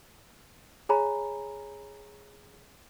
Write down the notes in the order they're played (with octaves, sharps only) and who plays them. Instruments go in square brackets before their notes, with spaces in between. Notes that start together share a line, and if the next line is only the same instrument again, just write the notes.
[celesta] G#4 C#5 G#5 A#5 B5